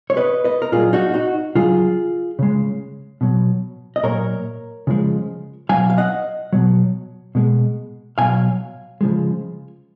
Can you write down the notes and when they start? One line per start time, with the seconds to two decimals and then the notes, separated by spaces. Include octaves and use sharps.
0.10 C#5
0.17 B4 D#5
0.44 B4 D#5
0.62 A#4
0.72 A#2 F#3 F4 G#4
0.93 D#4 F#4
1.14 D#4 F#4
1.55 C#3 F#3 F4 G#4
2.39 C#3 G#3
3.21 B2 F#3
3.96 D#5
4.03 A#2 F#3 A#4 C#5
4.87 C#3 F3 G#3
5.69 B2 F#3 F5 G#5
5.90 F5
5.98 D#5 F#5
6.53 B2 F#3
7.35 B2 G#3
8.18 B2 F#3 F5 G#5
9.01 C#3 F3 G#3